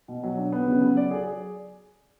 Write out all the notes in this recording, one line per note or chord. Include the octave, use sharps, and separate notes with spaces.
B2
F#3
D4
B3
C#3
F#3
D5
G#4